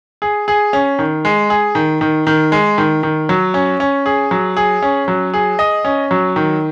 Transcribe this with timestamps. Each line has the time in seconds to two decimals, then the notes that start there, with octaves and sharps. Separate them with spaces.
0.22 G#4
0.48 G#4
0.73 C#4
0.99 D#3
1.25 G#3
1.50 G#4
1.75 D#3
2.01 D#3
2.27 D#3
2.52 G#3
2.78 D#3
3.03 D#3
3.29 F#3
3.54 C#4
3.80 C#4
4.06 G#4
4.31 F#3
4.57 G#4
4.82 C#4
5.08 F#3
5.34 G#4
5.59 D#5
5.85 C#4
6.11 F#3
6.36 D#3